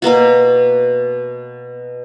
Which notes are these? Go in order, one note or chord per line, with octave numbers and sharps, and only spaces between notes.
B2 A#3 B3 F#4